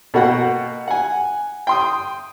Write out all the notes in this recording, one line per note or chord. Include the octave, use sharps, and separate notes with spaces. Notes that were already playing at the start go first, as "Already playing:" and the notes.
B2 A#3 F#4 F#5 G5
F#5 G#5
G5 C6 D#6